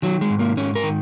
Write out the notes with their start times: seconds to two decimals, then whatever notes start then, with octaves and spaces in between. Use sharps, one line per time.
0.02 D#3 F#3
0.21 G#3
0.30 G#2
0.39 A#3
0.57 G#2 C#4
0.75 A#4
0.83 D#3